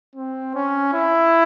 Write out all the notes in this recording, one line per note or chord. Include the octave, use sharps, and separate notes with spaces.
C4
C#4
E4